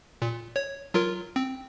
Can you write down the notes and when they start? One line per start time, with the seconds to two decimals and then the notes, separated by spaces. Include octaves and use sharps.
0.22 A#2
0.56 C#5
0.94 F#3 F4 A#4
1.36 C4